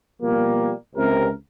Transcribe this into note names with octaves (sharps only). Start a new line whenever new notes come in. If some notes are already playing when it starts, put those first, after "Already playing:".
B2 F3 G3 A#3
C#2 C3 A#4